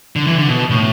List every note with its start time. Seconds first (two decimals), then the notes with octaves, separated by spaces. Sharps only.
0.16 D3
0.27 E3
0.38 D3
0.49 B2
0.70 A2